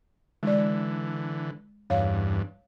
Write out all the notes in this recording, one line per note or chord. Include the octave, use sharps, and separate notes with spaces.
D3 E3 G#3 D5
E2 G2 C#5 F5